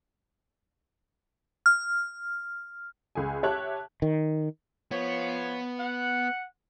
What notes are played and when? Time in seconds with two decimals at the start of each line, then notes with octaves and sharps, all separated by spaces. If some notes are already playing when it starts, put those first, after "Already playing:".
1.66 F6
3.15 C#2 G#4 G#5
3.43 G4 C#5 E5 A5 F#6
4.02 D#3
4.91 F3 B3 C#5
5.79 F#5